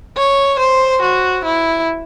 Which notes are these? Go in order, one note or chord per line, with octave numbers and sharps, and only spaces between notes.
C#5
C5
F#4
E4